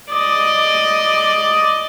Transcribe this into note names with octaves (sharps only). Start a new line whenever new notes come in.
D5 D#5